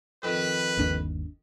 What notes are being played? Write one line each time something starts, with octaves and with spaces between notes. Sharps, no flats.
F2 D#3 B4
G1 D#2 D4